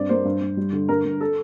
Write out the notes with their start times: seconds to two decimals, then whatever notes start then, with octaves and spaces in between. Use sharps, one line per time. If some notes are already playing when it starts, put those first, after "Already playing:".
Already playing: G2 C4 D5
0.09 A#3 C5
0.25 G2
0.41 G2
0.57 G3
0.73 D3
0.89 G2 A#4
1.05 G2
1.21 A4